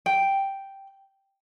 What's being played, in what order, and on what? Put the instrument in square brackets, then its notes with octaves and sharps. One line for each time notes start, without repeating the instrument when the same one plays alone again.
[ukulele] G5